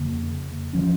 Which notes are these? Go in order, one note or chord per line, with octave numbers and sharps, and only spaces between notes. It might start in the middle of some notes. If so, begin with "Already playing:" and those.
Already playing: F2 C#3 A#3
F3 C#4